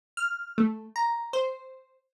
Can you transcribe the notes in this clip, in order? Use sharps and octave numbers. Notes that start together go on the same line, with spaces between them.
F6
A3
A#5
C5